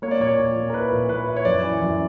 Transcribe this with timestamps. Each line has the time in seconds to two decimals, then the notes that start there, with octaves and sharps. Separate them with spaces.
0.02 A#3 C#5
0.11 D5
0.20 A#2 C#5
0.38 A#2
0.56 A#2
0.70 A#4
0.73 E4 B4
0.92 A#2
1.09 A#2 B4
1.28 E4
1.36 C#5
1.45 F#2 D5
1.64 E3
1.81 F#2